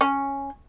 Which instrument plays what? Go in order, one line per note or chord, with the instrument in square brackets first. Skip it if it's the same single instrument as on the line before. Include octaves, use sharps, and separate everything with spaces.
[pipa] C#4